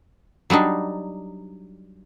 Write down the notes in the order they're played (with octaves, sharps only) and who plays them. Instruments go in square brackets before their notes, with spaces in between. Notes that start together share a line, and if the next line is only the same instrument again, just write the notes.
[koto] F#3 G3 D4 D#4